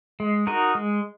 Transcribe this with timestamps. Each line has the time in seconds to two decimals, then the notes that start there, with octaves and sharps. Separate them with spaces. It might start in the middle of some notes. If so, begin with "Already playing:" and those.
0.20 G#3
0.47 D#4 F#4 A#4 D#5
0.75 G#3